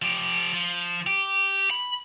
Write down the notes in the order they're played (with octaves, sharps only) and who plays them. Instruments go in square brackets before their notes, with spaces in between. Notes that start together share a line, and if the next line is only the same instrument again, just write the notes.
[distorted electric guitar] F3 G4
F3
G4
B5